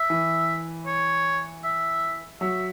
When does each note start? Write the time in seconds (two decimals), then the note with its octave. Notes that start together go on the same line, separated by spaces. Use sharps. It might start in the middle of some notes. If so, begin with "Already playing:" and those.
Already playing: E5
0.10 E3
0.86 C#5
1.64 E5
2.41 F#3 E5